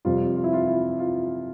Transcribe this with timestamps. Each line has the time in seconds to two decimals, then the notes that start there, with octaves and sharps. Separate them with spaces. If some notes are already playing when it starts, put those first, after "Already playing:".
0.05 F2 C3 G3 F4
0.36 F4
0.44 E4
0.53 F4
0.67 E4
0.99 F4